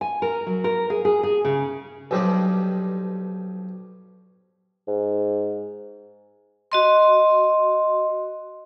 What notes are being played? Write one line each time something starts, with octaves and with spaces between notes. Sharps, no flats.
G#5
A#4
F#3
A#4
G#4
G#4
G#4
C#3
B1 G2 F3 G3 D#4 D5
G#2
F#4 D#5 C6